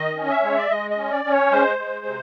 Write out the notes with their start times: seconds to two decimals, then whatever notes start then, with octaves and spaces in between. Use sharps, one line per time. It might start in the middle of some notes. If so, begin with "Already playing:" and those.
Already playing: D#3 D#5
0.16 C#4
0.30 E5
0.43 G#3 C#5
0.57 D5
0.70 G#3 D#5
0.91 D#5
0.98 C#4
1.11 D5
1.25 C#4
1.31 C#5
1.52 G#3 C5
1.78 G#3
2.06 C3